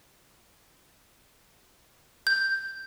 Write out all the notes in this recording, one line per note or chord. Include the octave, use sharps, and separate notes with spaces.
G6